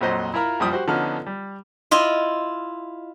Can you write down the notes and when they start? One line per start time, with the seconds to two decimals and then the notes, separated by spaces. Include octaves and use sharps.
0.01 A#1 F2 A#2 F#3 C5 D#5
0.34 E4 F4 A#4 A#5 B5
0.59 A#1 F#2 F3 G3 G5 D#6
0.73 F#4 G4 C5
0.88 D3 F3 B3 C#4 D#4 F6
1.26 G3
1.91 E4 F4 D#5